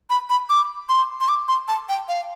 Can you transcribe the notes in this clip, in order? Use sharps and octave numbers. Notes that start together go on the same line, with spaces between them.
B5
B5
D6
C6
C6
D6
C6
A5
G5
F5